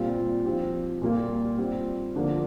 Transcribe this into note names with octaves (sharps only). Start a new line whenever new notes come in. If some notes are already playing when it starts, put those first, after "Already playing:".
Already playing: A#2 G3 C4 F4
F3 C4 G4
A#2 G3 A#3 F4
G3 C4 F4
D3 F3 A#3 D4 F4